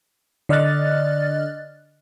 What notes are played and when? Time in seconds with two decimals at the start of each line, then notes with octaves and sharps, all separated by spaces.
0.49 D3 D5 D#5 F6 F#6 A6